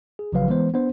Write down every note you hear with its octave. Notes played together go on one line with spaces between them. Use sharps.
G#4
A1 C#3 F3 F#3 B4 F5
E3 G#3 B3 C5
B3 D4 C5